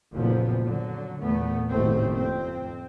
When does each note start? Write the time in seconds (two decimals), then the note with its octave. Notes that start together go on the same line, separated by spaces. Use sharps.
0.14 F#1 F2 A#2 F3 B3
0.63 D3 F#3
1.22 E2 A#2 A3 B3
1.70 F#1 D#2 A2 A3 C4
2.13 F2 C4